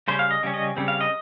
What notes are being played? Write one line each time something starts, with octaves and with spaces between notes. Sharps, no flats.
C#3 G3 C#4 C5
F5
D#5
C#3 G3 C#4
D#5
C#3 G3 C4
F5
D#5